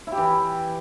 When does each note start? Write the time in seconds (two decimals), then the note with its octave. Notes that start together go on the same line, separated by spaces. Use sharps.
0.07 E4
0.12 G4
0.17 E3